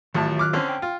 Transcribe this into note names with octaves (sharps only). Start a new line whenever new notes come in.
A1 A2 D#3 F#3 F4 A5
D6 F6 F#6
D3 C4 C#4
G5
F4